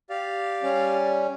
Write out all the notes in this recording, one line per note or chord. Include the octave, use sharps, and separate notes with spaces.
G4 D5 F5
G3 C#4